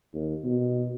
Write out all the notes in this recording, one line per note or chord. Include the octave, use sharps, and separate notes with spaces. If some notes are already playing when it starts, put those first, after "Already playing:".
D#2
B2